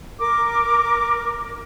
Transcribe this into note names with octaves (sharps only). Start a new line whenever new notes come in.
A#4 D6